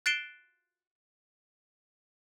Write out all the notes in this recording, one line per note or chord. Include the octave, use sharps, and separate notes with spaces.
F#6 A6 C7 D7 E7 G7